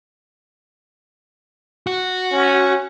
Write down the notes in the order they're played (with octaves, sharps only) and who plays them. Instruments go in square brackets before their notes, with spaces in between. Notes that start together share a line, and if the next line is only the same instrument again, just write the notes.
[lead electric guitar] F#4
[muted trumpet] C#4